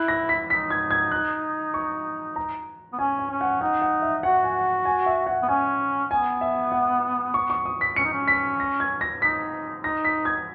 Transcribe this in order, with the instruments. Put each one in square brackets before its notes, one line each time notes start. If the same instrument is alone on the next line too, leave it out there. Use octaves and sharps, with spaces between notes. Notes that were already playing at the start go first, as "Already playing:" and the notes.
Already playing: [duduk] E4 [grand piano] F#6
[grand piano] A#6
B6
[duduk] D#4 [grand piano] B6
[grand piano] G#6
G#6
F#6
C#6
A#5
[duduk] B3
[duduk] C#4 [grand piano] G#5
[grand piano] G#5
[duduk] C#4
[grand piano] F#5
[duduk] D#4 [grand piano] F#5
[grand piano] F#5
E5
[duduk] F#4 [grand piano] F#5
[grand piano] G#5
G#5
E5
F#5
[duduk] B3
[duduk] C#4 [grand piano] G#5
[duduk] B3 [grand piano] G#5
[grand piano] E5
F#5
C#6
C#6
D#6
B6
[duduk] C#4 [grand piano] C#7
[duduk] D#4
C#4
[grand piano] B6
A#6
G#6
A#6
[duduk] D#4 [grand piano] B6
[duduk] D#4 [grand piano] A#6
[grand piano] B6
G#6